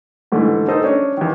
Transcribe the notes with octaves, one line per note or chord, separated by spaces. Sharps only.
G#2 D3 E3 A3
D#4 A4 C5 D#5
C#4 D4
E2 D#3